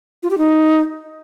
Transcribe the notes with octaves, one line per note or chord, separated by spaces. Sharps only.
F4
G4
D#4